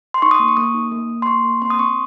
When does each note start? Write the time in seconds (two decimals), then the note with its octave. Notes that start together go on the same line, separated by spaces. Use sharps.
0.14 C6
0.22 D#4 C#6
0.31 D#6
0.40 A#3
0.48 C#6
0.57 A#3 D#6
0.74 D#4
0.92 A#3
1.10 A#3
1.22 C6
1.27 A#3 C#6
1.44 A#3
1.62 C4 C6
1.70 D#6
1.79 C4 C#6